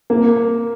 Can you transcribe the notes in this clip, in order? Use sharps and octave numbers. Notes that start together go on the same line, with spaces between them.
A#3